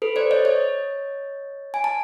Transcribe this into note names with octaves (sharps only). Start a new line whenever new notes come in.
A4 B4
C5 D5
C#5 D#5
C#5 D#5
G#5
A5